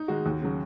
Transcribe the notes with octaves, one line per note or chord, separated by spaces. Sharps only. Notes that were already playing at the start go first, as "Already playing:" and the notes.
Already playing: D#4
D#3 G#3 F#4
D#2
C#3 F#3